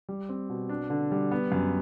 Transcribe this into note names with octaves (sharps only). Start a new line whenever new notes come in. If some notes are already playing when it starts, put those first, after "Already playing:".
G3
C4
B2
D4
D3
G3
B3
F#2